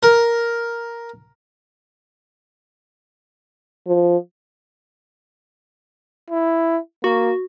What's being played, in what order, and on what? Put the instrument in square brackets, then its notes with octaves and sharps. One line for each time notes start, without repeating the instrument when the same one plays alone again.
[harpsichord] A#4
[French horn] F3
[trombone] E4
[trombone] A#3 [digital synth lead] F#4